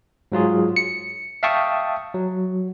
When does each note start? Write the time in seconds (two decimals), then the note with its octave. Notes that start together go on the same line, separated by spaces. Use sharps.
0.32 G#2 F#3 F4 G#4
0.76 C#7
1.43 E5 F5 G5 A5 C#6 D#6
2.14 F#3